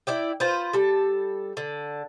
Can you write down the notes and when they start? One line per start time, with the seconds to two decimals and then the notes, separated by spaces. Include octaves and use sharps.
0.07 E4 D5 G5
0.40 F4 B4 C5
0.73 G3 A4
1.57 D3